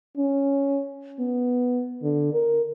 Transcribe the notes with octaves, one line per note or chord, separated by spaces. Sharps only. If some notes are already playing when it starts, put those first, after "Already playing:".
C#4
B3
D3
A#4